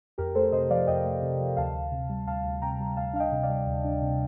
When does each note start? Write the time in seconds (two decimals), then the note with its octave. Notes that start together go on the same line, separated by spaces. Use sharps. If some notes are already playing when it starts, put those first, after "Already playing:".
0.18 F2 G4 A#4
0.35 A3 A4 C5
0.52 C3 C5 D#5
0.70 F3 D5 F5
0.87 F2 D#5 G5
1.05 A3
1.22 C3
1.40 F3
1.57 D2 F5 A5
1.75 D2
1.91 C3
2.09 G3
2.27 D2 F5 A5
2.44 D2
2.62 C3 G5 A#5
2.80 G3
2.96 D2 F5 A5
3.13 D4 F5
3.20 D#5 G5
3.32 C3
3.43 D5 F5
3.49 G3
3.66 D2
3.84 D4
4.02 C3